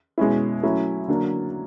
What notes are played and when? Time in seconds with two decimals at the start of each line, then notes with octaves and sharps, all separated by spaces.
0.18 B2 G#3 C#4 E4
0.63 F#3 A3 C#4 E4
1.08 D3 F#3 A#3 D4